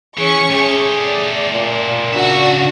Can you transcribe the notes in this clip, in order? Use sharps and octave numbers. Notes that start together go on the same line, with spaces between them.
E3 C#4 G#4 C#6 C#7
A3 G4 G#4
D5
A#2
C#3 D4 F#4 E5